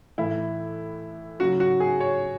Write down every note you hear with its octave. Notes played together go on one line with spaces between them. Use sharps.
A2 E3 E4
C#3 F#3 F#4
F#4
G#4
C#5